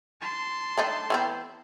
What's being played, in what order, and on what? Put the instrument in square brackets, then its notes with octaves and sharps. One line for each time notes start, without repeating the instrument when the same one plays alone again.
[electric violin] A5 C6
[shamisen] A3 D4 D#4
E3 B3 C4